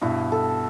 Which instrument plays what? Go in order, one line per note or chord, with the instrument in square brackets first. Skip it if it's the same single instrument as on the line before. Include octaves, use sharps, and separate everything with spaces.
[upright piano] G2 B2 [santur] E4
[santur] A4